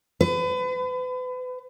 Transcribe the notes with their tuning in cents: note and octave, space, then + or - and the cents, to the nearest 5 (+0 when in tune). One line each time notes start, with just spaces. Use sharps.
B4 +35